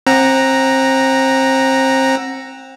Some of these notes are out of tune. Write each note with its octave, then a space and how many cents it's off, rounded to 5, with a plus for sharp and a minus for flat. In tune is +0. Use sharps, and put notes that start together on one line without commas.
C4 +25 F#5 +0 A#5 +0